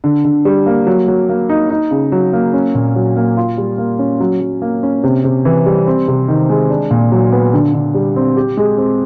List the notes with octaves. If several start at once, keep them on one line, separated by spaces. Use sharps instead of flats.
D3
D3
G3
A#3
F#3
F#3
A#3
D#4
D#4
C#3
F#3
A#3
C#4
A#2
F#3
A#3
F4
G3
A#3
C#4
F#3
F#3
A#3
C#4
C3
C3
E3
G3
C4
C3
D#3
G#3
D4
A#2
F#3
B3
D3
D3
G3
C4
G4
G#3
C4